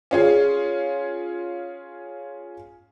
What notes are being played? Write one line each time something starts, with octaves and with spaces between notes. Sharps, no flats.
C#4 F4 G#4